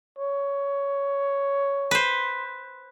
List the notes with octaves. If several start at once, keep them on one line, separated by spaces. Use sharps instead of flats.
C#5
B4 C5